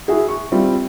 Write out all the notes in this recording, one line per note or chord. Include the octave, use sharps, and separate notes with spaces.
E4 F#4 G#4
C#6
G3 C4 E4 F4